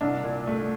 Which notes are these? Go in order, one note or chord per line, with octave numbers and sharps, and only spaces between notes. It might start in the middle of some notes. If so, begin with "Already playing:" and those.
C2 D4
A#2
A3